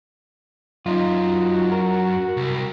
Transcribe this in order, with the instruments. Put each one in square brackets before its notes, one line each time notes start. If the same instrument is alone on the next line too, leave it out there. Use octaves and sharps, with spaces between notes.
[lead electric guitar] F#2 [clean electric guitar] D#4 F4
[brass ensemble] F#4
[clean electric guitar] A#4
[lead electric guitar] C2